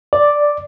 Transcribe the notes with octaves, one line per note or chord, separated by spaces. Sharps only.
D5